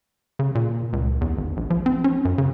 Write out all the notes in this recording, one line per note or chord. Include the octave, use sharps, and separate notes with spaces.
C#3
A#2
C#2
E2
G#1
A#1
F3
C4
C#4
F#2
C#3